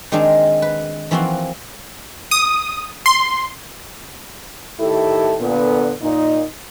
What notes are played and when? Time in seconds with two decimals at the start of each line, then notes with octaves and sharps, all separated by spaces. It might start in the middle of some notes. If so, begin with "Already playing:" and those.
0.12 D#3 G#3 C4 D4 D#4
0.62 B4
1.11 E3 F3 A#3 C4 F4 F#4
2.31 D#6
3.06 C6
4.79 A2 D#3 E4 G4 A4
5.40 A#2 D3 B3
6.01 A#2 D#4